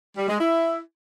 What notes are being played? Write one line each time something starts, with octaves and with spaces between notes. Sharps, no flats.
G3
G#3
E4